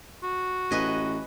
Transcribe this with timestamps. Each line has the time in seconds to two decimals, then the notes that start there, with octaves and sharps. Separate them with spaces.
0.23 F#4
0.71 A1 B4 D#5 G#5